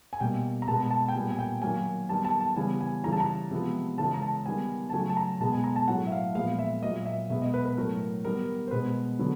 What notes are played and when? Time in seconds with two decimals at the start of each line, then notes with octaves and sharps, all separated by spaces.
0.13 G#5
0.20 B2 G3 A#3 G5
0.62 A#5
0.68 B2 G#3 B3 A5
0.91 A5
1.08 G5
1.14 A#2 G3 B3 G#5
1.30 G#5
1.39 G5
1.62 D#3 F#3 A#3 G#5
2.09 D#3 G3 B3 A5
2.25 A5
2.41 A5
2.56 C#3 E3 G3 B3 G#5
2.81 G#5
3.04 C#3 E3 G3 A#5
3.13 A5
3.20 A#5
3.51 C3 F3 G#3 B3
3.98 C#3 E3 G#3 A5
4.14 A#5
4.22 A5
4.46 D#3 G3 B3 G#5
4.90 A5
4.93 C#3 F#3 A3 G#5
5.09 A5
5.17 A#5
5.40 B2 G#3 B3 A5
5.52 G#5
5.64 A#5
5.76 A5
5.88 A2 F#3 A3 F#5
6.07 E5
6.12 F5
6.35 A#2 F3 G#3 B3 F5
6.59 E5
6.82 A#2 F#3 A#3 D#5
7.06 E5
7.30 B2 G#3 B3 E5
7.42 D#5
7.54 B4
7.66 B4
7.77 A2 F#3 A3 A#4
8.24 D#3 G3 B3 A#4
8.67 C5
8.71 B2 G#3 B3 B4
9.19 D3 F#3 B3